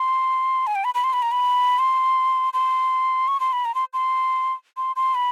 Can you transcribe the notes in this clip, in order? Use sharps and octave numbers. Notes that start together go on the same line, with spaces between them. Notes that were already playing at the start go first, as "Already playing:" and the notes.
Already playing: C6
G#5
G5
B5
B5
C6
B5
A#5
B5
C6
C6
C#6
C6
B5
A#5
C6
C6
C6
C6
B5